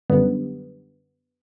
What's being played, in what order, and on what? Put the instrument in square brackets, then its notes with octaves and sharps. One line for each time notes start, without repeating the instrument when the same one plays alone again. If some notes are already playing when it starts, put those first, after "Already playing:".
[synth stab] F#2 D3 G3 B3